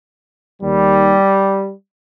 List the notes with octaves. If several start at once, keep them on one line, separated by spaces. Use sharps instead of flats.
D#2 D#3 G3